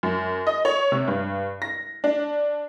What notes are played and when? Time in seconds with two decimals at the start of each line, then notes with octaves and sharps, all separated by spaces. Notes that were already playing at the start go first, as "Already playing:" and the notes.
0.03 F#2
0.47 D#5
0.65 C#5
0.92 C3
1.08 G2
1.62 A#6
2.04 D4